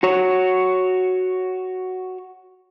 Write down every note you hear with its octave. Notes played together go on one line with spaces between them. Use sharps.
F#4 C#5